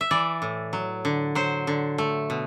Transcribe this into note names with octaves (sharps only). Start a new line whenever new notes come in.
E5
E3 D5
A2
F#3
D3
F#3 C5
D3
A3
B2